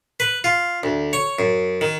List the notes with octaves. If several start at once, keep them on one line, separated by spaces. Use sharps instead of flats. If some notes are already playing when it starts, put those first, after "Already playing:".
B4
F4
D2
C#5
F#2
D#3